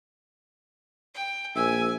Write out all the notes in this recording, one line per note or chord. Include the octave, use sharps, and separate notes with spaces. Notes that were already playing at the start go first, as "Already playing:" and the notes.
G5
A#1 E5 G#5